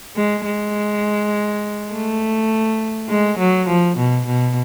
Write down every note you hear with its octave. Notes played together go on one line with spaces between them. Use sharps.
G#3
G#3
A3
G#3
F#3
F3
B2
B2